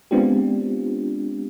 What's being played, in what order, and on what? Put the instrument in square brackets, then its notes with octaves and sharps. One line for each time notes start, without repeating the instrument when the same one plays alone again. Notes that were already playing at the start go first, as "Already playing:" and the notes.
[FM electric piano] G#3 B3 C4 D4 F4 G4